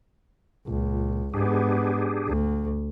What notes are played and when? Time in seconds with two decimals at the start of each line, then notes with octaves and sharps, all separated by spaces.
0.67 C#2 A#2
1.34 G#2 B3 D4 G4 G#4
2.27 D2